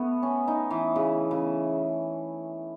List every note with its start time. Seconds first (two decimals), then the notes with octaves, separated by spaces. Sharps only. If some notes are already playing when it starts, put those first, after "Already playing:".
Already playing: A3 B3
0.23 C#4
0.48 D#4
0.71 E3
0.96 C#3
1.31 C#3